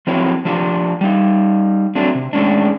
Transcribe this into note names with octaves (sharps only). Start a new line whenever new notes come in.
F3 F#3 C4 E4 C#5
F3 D4 F4 G4
G3 D#4
F#3 A3 C4 D4
C3
A2 G#3 C#4 D4